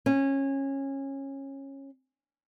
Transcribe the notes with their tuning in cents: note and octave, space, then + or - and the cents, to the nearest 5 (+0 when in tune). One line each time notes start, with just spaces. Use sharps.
C#4 -20